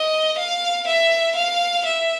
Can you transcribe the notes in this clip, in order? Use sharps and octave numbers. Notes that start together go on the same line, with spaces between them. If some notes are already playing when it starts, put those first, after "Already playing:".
Already playing: D#5
F5
E5
F5
E5